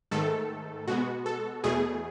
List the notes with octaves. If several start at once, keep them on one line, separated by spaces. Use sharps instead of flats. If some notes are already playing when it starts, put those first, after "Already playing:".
G#2 D#3 A3 A4
B2 G#3 B3 F#4
A4
E2 B2 A3 G#4